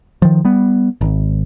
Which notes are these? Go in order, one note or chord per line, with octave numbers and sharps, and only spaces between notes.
D#3 F3
G3 B3
G#1